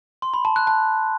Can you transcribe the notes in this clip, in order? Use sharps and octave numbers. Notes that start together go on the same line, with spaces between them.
C6
B5
A5
F#6
A5